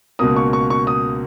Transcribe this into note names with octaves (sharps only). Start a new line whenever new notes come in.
C#2 B2 A#3 D#6
C#6
C#6
C#6
D#6